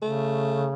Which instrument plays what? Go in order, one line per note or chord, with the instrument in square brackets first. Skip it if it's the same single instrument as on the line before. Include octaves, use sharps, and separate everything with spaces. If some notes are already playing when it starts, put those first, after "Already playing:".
[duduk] C#3 [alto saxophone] A3